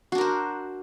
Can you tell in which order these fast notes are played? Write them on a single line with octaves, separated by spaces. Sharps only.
F#4 D4 A#4 C5